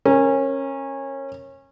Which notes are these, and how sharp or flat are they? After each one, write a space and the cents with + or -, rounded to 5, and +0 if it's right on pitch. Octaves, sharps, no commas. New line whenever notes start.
C#4 -25 A#4 +0